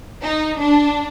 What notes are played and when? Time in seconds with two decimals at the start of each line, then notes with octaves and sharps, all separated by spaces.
0.22 D#4
0.58 D4